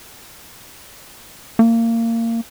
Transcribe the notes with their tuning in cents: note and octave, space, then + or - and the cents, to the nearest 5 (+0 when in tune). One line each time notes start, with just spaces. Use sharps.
A#3 -25